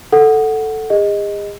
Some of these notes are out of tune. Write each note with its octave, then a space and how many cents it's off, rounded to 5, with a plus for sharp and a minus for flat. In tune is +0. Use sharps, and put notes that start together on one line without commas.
A4 +0 F#5 +0
G#4 -40 D#5 +0